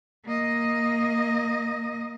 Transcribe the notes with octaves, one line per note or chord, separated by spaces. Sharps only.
A#3 D#5